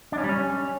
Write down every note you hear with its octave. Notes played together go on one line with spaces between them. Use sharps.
D4
C#4
G3
C#4